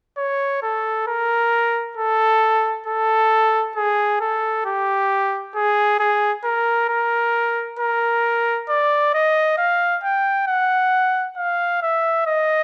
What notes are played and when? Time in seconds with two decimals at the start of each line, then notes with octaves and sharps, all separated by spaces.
0.17 C#5
0.62 A4
1.07 A#4
1.97 A4
2.86 A4
3.75 G#4
4.20 A4
4.65 G4
5.55 G#4
5.99 G#4
6.44 A#4
6.89 A#4
7.79 A#4
8.69 D5
9.14 D#5
9.58 F5
10.03 G5
10.47 F#5
11.37 F5
11.82 E5
12.26 D#5